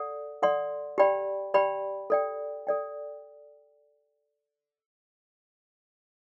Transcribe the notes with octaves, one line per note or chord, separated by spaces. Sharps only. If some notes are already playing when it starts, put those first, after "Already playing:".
Already playing: A4 D5 F#5
A4 D5 F#5 C6
G4 D5 G5 B5
G4 D5 G5 B5
A4 D5 G5
A4 D5 G5